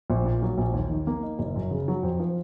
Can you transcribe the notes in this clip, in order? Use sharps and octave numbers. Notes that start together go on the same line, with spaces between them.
A#1
A#2
F#3
A#1
D#2
D#3
A#3
D#4
F#1
F#2
C#3
F#3
F2
F3